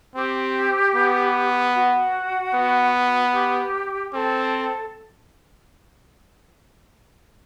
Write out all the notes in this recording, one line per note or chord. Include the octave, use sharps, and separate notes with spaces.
C4 G4
B3
F#4
B3
G4
C4 A4